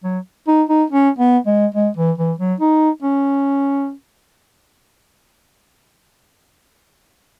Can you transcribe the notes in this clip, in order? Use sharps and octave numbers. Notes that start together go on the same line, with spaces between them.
F#3
D#4
D#4
C#4
B3
G#3
G#3
E3
E3
F#3
D#4
C#4